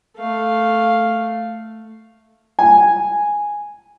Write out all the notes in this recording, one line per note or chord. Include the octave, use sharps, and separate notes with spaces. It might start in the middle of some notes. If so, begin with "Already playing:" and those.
A3 F5
G#5